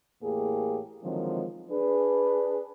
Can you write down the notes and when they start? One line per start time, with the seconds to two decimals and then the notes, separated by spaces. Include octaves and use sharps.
0.22 E2 A2 A#3 G4 G#4
1.03 D3 D#3 F3 F#3 G#3 C4
1.70 D4 G#4 B4